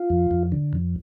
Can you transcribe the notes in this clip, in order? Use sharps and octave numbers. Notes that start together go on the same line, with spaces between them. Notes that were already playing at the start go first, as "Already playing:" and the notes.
Already playing: F4
F2
F2
D3
F2